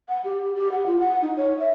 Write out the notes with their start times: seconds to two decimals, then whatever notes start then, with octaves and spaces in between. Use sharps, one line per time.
0.09 F#5
0.24 G4
0.55 G4
0.72 F#5
0.87 F4
1.00 F#5
1.22 D#4
1.37 C#5
1.59 E5